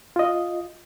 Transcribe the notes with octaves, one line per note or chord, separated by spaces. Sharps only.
F4 D#5